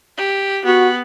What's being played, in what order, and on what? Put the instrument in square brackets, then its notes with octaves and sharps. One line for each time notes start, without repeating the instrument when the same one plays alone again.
[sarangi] G4
[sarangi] B3 [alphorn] F#4